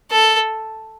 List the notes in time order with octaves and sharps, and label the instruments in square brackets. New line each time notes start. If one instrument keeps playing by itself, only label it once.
[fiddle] A4